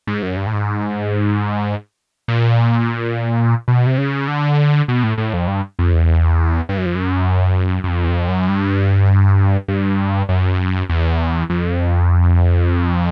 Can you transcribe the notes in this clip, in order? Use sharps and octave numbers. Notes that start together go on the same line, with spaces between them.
G#2
F#2
G2
A2
G#2
A#2
B2
C3
C#3
D3
B2
A2
A2
F2
G2
F2
E2
G2
F#2
F2
F#2
F#2
F2
E2
F2
F#2
G2
G2
F#2
E2
F2